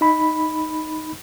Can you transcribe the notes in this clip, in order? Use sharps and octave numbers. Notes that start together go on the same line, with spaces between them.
D#4 B5